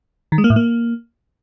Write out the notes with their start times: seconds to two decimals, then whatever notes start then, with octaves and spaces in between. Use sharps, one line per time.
0.32 D#3
0.38 G#3
0.44 A#3
0.50 A2
0.56 A#3